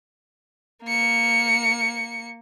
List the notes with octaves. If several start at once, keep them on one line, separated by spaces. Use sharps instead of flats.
A#3 C#7